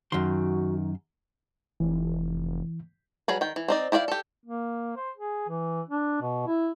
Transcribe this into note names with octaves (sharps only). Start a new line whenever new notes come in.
F#2 D#3 F#4 C6
F1 E3
F#3 G3 G#4 B4
D#3 G5
E3
C4 D#4 D5
E4 G4 D5 E5 F5
G4 A4
A#3
C5
G#4
E3
D4
B2
E4